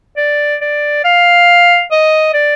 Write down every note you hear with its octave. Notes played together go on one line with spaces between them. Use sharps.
D5
D5
F5
D#5
D5